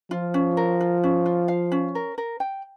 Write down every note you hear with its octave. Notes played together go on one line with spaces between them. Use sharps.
F3 F4
C#4
A#4
F4
C#4
F4
F5
C#4
A#4
A#4
G5